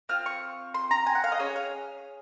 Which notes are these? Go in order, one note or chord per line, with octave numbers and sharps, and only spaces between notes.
C4 F4 F6
C#6
C6
A#5
G#5
F#5
F5
D#5
C#4 G#4 C#5
F5